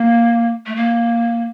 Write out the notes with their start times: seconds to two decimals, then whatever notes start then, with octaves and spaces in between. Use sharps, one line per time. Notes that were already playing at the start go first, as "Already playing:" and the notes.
Already playing: A#3
0.66 A3
0.76 A#3